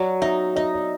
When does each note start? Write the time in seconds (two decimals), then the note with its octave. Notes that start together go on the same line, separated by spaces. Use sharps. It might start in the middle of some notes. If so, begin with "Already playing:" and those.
Already playing: F#3 D5
0.22 D#4 E5
0.56 D#4 D#5
0.74 D5